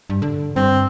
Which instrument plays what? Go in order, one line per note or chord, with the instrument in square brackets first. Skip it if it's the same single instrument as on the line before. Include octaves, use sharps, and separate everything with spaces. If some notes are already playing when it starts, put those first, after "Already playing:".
[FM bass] G2
D3
[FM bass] G2 [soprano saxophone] C4